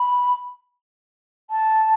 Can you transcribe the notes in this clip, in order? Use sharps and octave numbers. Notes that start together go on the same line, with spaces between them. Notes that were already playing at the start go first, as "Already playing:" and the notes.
Already playing: B5
A5